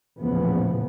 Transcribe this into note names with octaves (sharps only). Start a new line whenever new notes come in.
A#1 E2 A2 C#3 F3 B3